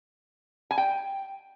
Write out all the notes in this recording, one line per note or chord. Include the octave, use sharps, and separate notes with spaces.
G#5
G5